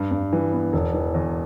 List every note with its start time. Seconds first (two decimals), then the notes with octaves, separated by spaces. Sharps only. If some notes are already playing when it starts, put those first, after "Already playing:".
Already playing: G2
0.11 G2
0.33 E3
0.53 B3
0.73 E1
0.94 E3
1.14 E2